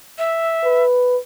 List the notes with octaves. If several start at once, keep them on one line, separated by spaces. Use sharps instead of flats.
E5
B4